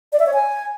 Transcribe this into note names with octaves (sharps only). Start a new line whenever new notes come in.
D5
E5
C#5
G#5